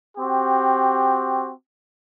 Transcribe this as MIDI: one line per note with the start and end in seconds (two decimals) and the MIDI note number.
0.17 1.50 60
0.17 1.50 66
0.17 1.50 67